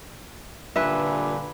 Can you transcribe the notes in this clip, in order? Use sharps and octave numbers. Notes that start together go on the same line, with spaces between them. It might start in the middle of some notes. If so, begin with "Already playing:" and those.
G2 A#2 D3 B4 E5